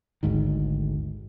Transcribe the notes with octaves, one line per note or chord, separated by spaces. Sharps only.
G#1 D2 G#2 D#3